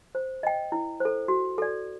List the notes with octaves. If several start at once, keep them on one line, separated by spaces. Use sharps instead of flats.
C5
D#5 G5
E4
A4 C5
F#4
A4 D5